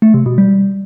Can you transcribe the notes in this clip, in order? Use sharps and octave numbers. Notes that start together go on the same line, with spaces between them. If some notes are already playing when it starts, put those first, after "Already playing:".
A3
C3
B2
G3